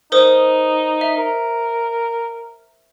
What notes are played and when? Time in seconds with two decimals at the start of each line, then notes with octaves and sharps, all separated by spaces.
0.12 D#4 A#4 C5 D#6
1.01 E5
1.17 A#4